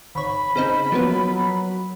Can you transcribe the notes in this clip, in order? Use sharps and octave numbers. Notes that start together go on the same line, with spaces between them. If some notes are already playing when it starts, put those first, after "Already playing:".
G#1 C#5 B5
C#3 C4 D#4
F3 F#3 A#3 B3